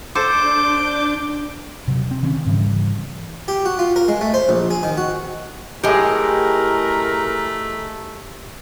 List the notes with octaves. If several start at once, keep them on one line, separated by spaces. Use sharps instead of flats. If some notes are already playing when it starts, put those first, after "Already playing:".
D4 A4 C5 D6 G6
C3 F#3
C4
D#3 C4 C#4
G#2 C#3 E3 G3
G4
F#4
F4
A#4
G#3
A3
C5
A#1
G#4
D#3
F#4
A2 G#3 A3 G4 G#4 A#4